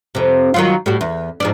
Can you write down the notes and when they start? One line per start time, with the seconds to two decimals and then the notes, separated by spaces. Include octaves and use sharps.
0.15 F2 C3
0.54 D#3 F#3 F4
0.86 A2 G3 F#4
1.01 E2
1.40 G#2 F3 D4